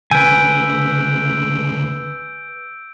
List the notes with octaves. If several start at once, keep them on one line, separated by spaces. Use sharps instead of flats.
D2 C#3 B4 G#5 E6 G6 D7